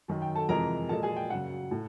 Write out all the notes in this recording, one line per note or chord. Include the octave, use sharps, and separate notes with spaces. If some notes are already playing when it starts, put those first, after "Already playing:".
F#2 D#3 F#3
G5
A4 A5
F2 C3 E3 G#3 A#4 A#5
A#2 F3 G#3 A4 A5
G#4 G#5
G5
F#2 C#3 F#3 F#5
A2